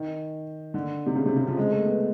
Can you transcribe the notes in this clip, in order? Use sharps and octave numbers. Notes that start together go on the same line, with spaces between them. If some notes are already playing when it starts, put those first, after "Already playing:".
Already playing: D#3
D3
C3
C#3
C3
C#3
F3
G#3
A3
B3